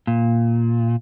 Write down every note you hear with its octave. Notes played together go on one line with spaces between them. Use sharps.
A#2